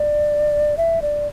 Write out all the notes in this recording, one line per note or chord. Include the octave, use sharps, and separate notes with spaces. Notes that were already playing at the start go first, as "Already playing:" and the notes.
Already playing: D5
E5
D5